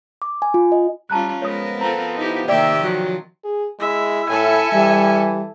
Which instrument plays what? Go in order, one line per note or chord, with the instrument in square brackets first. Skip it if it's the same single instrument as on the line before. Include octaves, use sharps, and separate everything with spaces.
[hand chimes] D6
G#5
F4
D#5
[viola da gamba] G3 C#4 F4 [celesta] A5 A#5 F#6
[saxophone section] F3 B3 [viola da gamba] G#3 [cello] A#4 B4 [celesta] C#5 D#6
[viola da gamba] C4 F4 A4 [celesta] A#5
[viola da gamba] D#4 E4 G4
[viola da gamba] C3 D#3 [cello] A#3 G4 [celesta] D5 G5 [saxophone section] E5
[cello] F3 [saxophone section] F#3
[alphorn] G#4
[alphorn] G#3 [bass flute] E4 [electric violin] E5
[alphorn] A2 [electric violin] A4 G#5 [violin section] E5 C#7
[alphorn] E3 [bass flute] G3